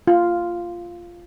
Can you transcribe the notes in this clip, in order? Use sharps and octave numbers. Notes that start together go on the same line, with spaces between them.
F4